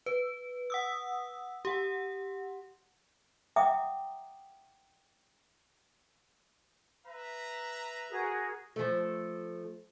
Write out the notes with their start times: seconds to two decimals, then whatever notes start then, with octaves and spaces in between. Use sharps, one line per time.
0.06 B4
0.70 F#5 D#6 E6
1.65 G4 F#5
3.56 E5 F#5 G5 A#5 D6 D#6
7.06 B4 E5 A#5
8.10 F#4 G#4 A#4
8.76 F3 A3